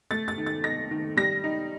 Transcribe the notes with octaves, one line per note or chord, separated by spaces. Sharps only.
A3 A6
A6
D#3
A6
D#4 A#6
D#3
G3 A#6
D#4